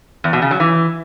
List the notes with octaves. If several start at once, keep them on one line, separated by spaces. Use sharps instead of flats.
E2
B2
C#3
F#3
E3